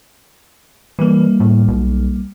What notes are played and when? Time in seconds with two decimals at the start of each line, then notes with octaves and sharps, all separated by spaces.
0.99 E3 G3 A#3
1.40 A2
1.68 B1